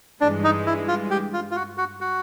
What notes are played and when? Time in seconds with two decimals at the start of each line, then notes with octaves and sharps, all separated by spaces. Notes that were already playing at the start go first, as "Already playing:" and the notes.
0.21 G2 E3 G#3 D4
0.44 D#4
0.67 E4
0.88 F4
1.11 G4
1.33 F4
1.51 F4
1.56 F#4
1.78 F#4
2.01 F#4